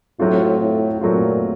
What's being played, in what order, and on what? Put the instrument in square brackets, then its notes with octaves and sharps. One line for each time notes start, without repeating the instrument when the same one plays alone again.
[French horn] A2 [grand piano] F#3 A3 C4 F4
[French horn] A2
[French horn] A#2 [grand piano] F#3 A3 C4 F4